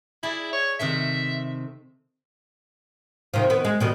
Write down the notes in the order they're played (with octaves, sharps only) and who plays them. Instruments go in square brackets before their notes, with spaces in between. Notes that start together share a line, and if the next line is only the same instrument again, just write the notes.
[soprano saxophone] E4 [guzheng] G#4 D5
[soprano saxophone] C#5
[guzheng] C3 D#3 A3 [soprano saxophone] E5
[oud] C3 D#3 F3
D#3 B3
G#3
B2 D#3 G3